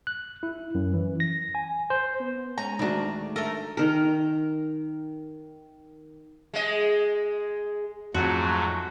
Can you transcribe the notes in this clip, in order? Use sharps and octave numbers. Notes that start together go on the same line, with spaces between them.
F#6
E4
F#2
E3
A#6
G#5
C5
B3
G#3 C#4 A#5
D2 D#3 A3 D4 F#4
A3 A4 A#4
D#3 A#4
G#3 D#5
F2 G#2 F#3 A3 F#4